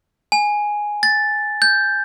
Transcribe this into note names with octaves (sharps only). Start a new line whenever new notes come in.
G#5
A6
G6